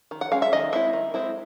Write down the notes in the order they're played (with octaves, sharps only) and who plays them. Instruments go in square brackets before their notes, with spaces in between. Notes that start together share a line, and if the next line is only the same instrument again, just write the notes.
[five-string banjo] D#3
F#5
G#3 C#4 F5
E5
D#3 D#5
G#3 C4 E4 E5
D#3
G#3 C4 E4